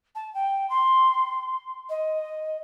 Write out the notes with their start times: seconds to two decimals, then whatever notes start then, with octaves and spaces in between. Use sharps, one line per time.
0.15 A5
0.34 G5
0.69 C6
1.89 D#5